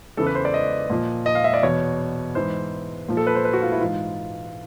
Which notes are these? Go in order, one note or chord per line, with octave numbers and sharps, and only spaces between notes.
E2 C#3 E3 A4
B4
C5
D5
D#5
A#2 F3
D#5
F5
E5
D5
E2 B2 C#5
G#2 E3 C5
A#2 F3
A4
B4
C5
B4
F#4
F4
E4
G#2 E3 F4